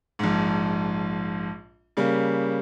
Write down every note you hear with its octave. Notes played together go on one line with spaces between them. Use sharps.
A#1 G#2
C#3 G3 A#3